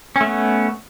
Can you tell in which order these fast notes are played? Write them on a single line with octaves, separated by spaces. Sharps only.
C#4 A3 B3